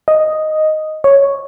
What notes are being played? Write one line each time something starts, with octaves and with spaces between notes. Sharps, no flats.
D#5
C#5